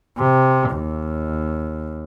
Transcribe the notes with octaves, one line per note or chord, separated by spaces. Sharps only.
C3
D#2